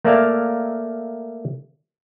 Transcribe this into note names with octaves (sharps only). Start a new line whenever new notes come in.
A3 A#3 A#4 D5 E5 F5